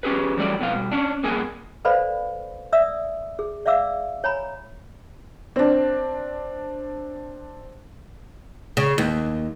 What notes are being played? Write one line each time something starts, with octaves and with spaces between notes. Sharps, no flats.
C#4 G4 G#4 B4
E2 F#3 G3 A3 D5
F2 B2 B3 F5
B2 G3
C#4 D4
G2 A#3 B3 G#4 G#5
A4 B4 C5 D5 F5 B5
D5 E5 D#6 E6
G#4
D5 E5 F5 D6 E6
C#5 G#5 A#5 B5
C4 D4
C#3
D#2